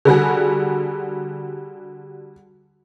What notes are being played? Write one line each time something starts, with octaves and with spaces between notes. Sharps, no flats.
D3 G3 F#4 G#4